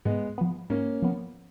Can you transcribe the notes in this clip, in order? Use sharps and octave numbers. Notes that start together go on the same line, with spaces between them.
G#2 G#3 B3
F3 B3
G#2 A#3 C#4
F3 B3